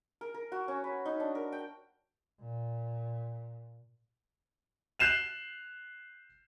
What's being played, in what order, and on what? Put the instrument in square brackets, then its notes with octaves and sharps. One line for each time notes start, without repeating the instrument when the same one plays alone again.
[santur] A#4
A#4
F#4
C#4
B4
D#4
D4
A#4
G5
[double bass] A#2
[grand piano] F#6 G6 C7 E7 F7